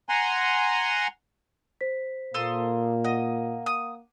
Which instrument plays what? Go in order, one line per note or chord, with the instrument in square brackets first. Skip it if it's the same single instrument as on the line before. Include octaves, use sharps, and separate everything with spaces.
[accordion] F#5 G#5 A#5 C6
[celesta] C5 B6
[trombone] A#2 [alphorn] A#3 [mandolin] A4 C6 D#6
[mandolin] D#5 [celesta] F#5
[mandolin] D#6